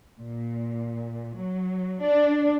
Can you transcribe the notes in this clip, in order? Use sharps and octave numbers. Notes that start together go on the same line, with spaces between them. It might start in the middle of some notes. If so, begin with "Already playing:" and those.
A#2
F#3
D4